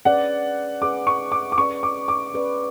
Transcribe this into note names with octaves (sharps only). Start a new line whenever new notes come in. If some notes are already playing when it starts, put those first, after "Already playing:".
C#4 G#4 B4 D5 F#5
C#4 G#4 B4 D5 D6
C#6
D6
D6
C#4 G#4 B4 D5 C#6
D6
D6
C#4 G#4 B4 D5